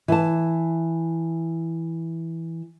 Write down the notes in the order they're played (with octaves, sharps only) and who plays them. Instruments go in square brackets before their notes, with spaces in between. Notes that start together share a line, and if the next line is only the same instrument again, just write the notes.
[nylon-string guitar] E3 A5